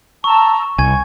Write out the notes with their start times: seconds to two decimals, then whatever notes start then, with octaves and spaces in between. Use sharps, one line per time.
0.24 A5 A#5 C#6 E6
0.78 C2 G#5 C#6 G#6